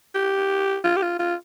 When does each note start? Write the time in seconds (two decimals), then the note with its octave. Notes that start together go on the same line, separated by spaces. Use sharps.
0.15 G4
0.84 F4
0.96 G4
1.02 F4
1.19 F4